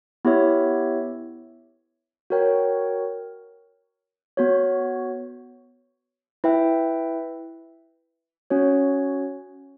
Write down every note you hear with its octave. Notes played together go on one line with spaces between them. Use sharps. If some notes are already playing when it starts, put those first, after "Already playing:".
B3 E4 G4 C#5 E5
F#4 A#4 C#5 G5
B3 F#4 C#5
E4 B4 E5 G5
C#4 F#4 C#5